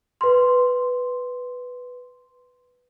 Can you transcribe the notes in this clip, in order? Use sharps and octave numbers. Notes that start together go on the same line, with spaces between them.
B4 C6